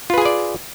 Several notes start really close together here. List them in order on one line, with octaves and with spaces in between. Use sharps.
F4 B4 G#4 G#5 D5